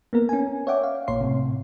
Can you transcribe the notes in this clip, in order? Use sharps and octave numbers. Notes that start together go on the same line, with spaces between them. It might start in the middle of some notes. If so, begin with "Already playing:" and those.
A#3 B3 A#4
C#4 G#5
C#5 D5 E5 F#5 G5 D6
F5
A1 A#2 C#5 C6 C7
A2 C3